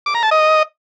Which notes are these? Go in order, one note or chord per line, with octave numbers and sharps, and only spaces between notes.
D6
A#5
A5
D#5